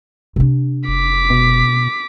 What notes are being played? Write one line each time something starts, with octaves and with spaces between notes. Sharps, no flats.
C3 D4
F1 D6 B6
B2